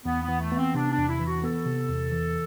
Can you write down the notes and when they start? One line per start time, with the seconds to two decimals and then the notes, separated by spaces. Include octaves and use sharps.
0.06 E2 B3
0.23 B3
0.28 E3
0.40 A3
0.52 B3
0.57 C4
0.75 C3 D4
0.91 D4
0.97 E2
1.08 E4
1.20 E3
1.26 F#4
1.43 B3 A4
1.66 C3
1.89 E2
2.12 E3